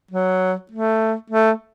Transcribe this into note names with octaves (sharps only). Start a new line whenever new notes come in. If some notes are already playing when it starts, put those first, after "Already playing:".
F#3
A3
A3